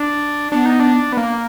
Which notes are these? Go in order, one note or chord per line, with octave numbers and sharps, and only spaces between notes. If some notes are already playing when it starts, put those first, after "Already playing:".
Already playing: D4
B3 D4
D#4
D4
B3
A#3